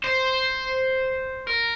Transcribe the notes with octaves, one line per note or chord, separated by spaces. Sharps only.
C5
A#4